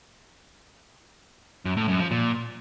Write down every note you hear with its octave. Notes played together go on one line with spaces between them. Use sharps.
F#2
A2
F#2
F3
A#2